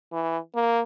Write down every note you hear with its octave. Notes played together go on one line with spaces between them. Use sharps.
E3
A#3